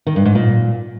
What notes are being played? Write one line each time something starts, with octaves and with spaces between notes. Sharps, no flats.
D#3
G2
G#2
A#2